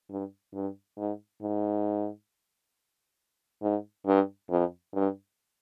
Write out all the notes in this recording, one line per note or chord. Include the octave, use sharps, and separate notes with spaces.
G2
G2
G#2
G#2
G#2
G2
F2
G2